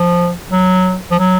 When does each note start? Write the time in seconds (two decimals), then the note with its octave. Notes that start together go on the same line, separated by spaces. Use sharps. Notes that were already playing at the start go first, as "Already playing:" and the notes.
Already playing: F3
0.52 F#3
1.11 F3
1.19 F#3